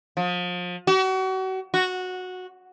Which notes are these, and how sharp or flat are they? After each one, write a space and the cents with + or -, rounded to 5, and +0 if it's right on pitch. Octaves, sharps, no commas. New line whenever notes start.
F3 +35
F#4 +35
F#4 -10